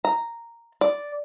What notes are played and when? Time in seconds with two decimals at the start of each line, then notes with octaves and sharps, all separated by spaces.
0.05 A#5
0.81 D5